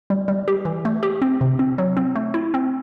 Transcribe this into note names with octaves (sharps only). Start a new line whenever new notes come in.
G3
G3
G4
E3
A3
G4
C4
C3
C4
F#3
C4
A3
E4
C4